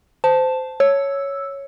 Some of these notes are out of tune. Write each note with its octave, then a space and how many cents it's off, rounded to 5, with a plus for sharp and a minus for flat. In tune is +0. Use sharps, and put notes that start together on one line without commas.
C5 -20 A5 +0
C#5 +0 E6 +0